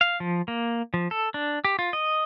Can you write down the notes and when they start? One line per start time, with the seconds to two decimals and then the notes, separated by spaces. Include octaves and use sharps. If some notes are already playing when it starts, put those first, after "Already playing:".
0.01 F5
0.20 F3
0.48 A#3
0.94 F3
1.11 A4
1.34 D4
1.65 G4
1.79 F4
1.93 D#5